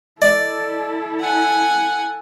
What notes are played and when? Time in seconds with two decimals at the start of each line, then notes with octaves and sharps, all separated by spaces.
0.22 E4 A4 D5 D#5
1.21 F#5 G#5